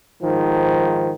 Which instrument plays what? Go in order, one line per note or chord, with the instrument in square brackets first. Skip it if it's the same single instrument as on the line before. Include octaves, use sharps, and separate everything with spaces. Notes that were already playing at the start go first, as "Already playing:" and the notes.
[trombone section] G#2 D#3 F3